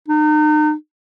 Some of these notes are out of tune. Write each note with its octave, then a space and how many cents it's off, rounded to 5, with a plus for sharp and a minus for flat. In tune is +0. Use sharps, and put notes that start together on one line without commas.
D#4 -35